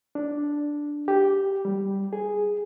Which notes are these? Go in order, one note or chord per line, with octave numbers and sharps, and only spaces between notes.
D4
G4
G3
G#4